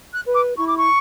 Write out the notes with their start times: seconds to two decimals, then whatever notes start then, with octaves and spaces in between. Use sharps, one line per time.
0.14 F#6
0.25 B4
0.34 D6
0.56 E4 C#6
0.67 D6
0.77 C#6